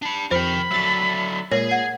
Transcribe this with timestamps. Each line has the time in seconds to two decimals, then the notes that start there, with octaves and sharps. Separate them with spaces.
0.02 D4 B5
0.31 F2 C3 A#4 C5 G5 B5
0.71 D3 F#3 E5 A6
1.52 A#2 G#3 G#4 C#5
1.71 F#5 G#6